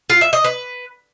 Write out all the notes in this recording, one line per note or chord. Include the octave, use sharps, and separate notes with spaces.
F4
E5
D#5
B4